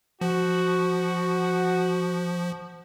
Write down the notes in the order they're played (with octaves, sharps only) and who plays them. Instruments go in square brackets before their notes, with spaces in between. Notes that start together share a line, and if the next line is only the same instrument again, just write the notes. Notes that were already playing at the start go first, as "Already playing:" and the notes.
[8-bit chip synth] F3 [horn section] F#4